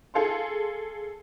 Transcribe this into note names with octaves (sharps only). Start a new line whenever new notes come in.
G#4 A4 F5 C6